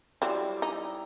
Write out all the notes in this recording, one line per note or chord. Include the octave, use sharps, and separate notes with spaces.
F#3 G3 C4 E4
D#4